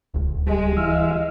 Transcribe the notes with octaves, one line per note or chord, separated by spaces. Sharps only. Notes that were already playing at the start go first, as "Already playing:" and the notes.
D1 C#2
G3 G#3
E3 E5 F5